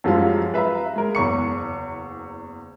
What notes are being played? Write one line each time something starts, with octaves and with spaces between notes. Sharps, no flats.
F#2 F3 G3 G#3 F4
B4 E5 F5 A#5
G#3 A#4
F#1 E2 C#6 C#7